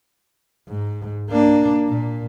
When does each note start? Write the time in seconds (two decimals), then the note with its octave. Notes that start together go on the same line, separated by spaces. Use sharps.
0.68 G#2
1.29 A#3 D4
1.88 A#2